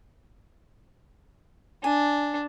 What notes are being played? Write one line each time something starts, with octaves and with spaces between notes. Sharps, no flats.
D4 G#5